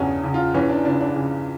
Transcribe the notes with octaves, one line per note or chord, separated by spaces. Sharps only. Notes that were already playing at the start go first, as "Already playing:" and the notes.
Already playing: E2 C#3 C#4 D4
C#3
F4
E3 C#4
D4
C#3 D4
D4
C#3